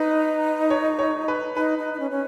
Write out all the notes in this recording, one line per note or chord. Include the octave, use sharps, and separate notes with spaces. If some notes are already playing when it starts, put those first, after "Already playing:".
Already playing: D#4 B4
C#5
C#5
B4
D#4 B4
D#4
D#4
C#4
C#4